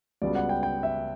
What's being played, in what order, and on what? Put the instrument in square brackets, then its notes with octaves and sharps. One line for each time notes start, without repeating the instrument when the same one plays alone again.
[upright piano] C#2 C#3 G3 B3 F#4 [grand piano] D5
[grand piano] F#5
G5
G5
E5